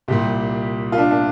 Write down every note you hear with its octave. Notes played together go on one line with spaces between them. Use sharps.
C2 A#2 G3 G4
F4
D4
D4